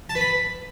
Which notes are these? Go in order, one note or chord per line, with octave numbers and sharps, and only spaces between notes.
A5
B4
B5